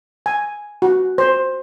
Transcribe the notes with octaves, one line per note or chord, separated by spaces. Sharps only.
G#5
F#4
C5